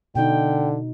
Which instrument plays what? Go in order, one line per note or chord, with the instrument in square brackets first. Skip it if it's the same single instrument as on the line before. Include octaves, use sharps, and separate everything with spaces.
[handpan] B2 D#4 [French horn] D3 [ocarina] G5